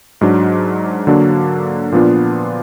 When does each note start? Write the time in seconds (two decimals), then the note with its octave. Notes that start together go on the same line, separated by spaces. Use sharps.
0.21 G#2 F#3 D4
1.07 D3 F#3 A#3 D4
1.92 A#2 F3 B3 D4 F4